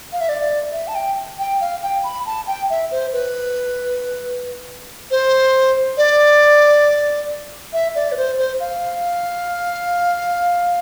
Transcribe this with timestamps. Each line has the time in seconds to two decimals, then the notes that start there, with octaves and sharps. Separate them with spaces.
0.12 F5
0.21 E5
0.29 D5
0.72 E5
0.88 A5
0.95 G5
1.38 G5
1.61 F5
1.83 G5
2.04 B5
2.26 A5
2.47 G5
2.70 E5
2.91 C5
3.13 B4
5.11 C5
5.97 D5
7.73 E5
7.95 D5
8.12 B4
8.17 C5
8.38 C5
8.60 F5